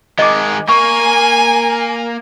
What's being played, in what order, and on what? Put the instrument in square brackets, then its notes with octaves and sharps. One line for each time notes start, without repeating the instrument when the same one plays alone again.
[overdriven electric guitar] D#3 G#3 [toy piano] D#5 D6
[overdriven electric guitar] A#3 [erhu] G#5 [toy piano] C#6